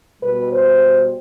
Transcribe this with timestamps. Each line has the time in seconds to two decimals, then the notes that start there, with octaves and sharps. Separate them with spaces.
0.21 B2 G3 B4
0.51 C5